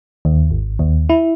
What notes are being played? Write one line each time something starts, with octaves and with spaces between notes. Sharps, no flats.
D#2
G#1
D#2
E4